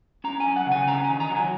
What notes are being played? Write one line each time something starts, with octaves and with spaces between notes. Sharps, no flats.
C#4 A#5
G#5
F#2
F#5
C#3
G#5
C#4 A#5
G#5
D#3
A#5
F#3
G#5